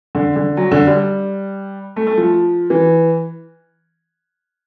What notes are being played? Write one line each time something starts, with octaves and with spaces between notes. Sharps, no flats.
D3
D3
F#3
D3
G3
A3
A3
F3
E3